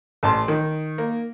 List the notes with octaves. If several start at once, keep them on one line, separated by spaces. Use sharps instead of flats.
A1 A5 C6
D#3
A#3